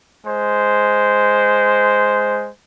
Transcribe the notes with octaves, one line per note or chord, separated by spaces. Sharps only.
G#3 C5